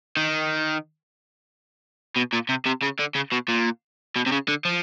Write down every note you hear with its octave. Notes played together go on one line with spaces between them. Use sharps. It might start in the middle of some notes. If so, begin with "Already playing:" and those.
D#3
B2
A#2
C3
C3
C#3
D3
C#3
B2
A#2
B2
C3
C#3
D3
F3